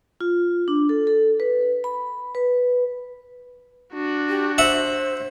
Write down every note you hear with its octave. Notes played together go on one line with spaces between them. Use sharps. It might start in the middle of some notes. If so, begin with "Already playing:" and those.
F4
D4
A4
A4
B4
B5
B4
D4 F#4
G4
C5 E5 F#5